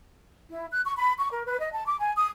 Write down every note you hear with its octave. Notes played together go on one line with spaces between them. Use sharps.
E4
F#6
C#6
B5
C#6
A#4
B4
D#5
A5
D6
G#5
D#6